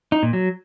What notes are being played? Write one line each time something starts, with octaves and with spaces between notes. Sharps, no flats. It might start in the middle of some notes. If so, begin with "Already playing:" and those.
D#4
A#2
F#3